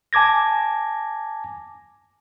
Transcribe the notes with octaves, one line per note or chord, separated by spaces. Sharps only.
G#5 A5 D6 G#6 A#6